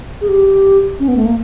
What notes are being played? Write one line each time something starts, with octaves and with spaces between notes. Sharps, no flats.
G#4
G4
C#4
B3
A3
A#3